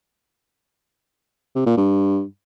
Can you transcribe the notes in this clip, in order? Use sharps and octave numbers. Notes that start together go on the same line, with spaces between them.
C3
A#2
G2